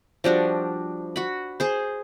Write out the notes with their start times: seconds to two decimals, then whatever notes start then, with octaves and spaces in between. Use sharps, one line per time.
0.24 F3 G3 D4 F#4
1.16 F#4 B5
1.60 G#4 C5